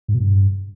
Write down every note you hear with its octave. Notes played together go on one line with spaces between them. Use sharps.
G#2
B2
G2